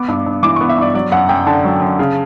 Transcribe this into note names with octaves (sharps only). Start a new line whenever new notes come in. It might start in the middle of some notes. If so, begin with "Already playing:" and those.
Already playing: B3 D6
G2
G2
E3 D6
C#6
B3
E5
G2 D5
F#3 D5
F#2 F#5
F#2 G5
D3 A5
F#3
F#2
C#3